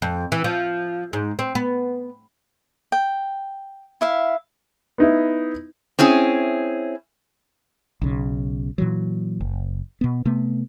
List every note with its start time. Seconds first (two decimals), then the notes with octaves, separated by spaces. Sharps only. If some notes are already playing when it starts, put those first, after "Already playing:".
0.02 F2
0.32 E3
0.44 F3
1.13 G#2
1.39 C4
1.55 B3
2.92 G5
4.01 E4 E5 F5
4.98 B3 D#4 E4
5.99 C4 C#4 E4 G#4
8.02 B1 C#3
8.78 A#2 E3 F#3
9.41 F#1
10.01 B2 B3
10.25 C3 A3 B3